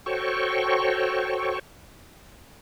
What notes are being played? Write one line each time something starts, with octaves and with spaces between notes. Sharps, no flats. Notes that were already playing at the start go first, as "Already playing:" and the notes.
F#4 A4 C5 C#5 G5 C#6